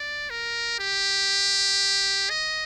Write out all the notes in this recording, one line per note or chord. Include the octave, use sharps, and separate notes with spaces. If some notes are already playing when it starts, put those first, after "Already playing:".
Already playing: D5
A#4
G4
D#5